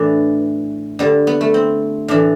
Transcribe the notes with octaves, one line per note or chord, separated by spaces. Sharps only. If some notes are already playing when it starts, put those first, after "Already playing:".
Already playing: A2 E3 D4
G2 D3 G3
B3
A3
C4
A2 E3 D4